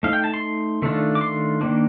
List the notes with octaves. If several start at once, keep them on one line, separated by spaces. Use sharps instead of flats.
A3 D#4 F5
G5
A5
C6
D#3 A3 D4 F4
D6
C6
D#3 G3 A#3 D4